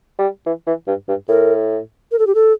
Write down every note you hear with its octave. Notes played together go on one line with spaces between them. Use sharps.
G3
E3
E3
G2
G2
A2 A#4
A#4
A4
G4
A4